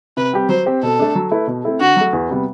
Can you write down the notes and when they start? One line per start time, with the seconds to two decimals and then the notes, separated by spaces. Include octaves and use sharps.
0.17 C3 B4
0.33 G3 C4 G4
0.49 F#3 C5
0.66 C4 G4 C5
0.82 B2 A4
0.99 A3 D4
1.15 F#3
1.32 A3 E4 B4
1.47 B2
1.64 A3 C4 E4 A4
1.80 D3 F#4
1.96 F#3 A3
2.13 E2
2.30 C3 G3 B3